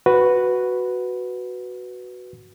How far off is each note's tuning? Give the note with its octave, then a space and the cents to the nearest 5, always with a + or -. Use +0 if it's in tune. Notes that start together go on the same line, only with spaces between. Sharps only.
F#4 +0 B4 +0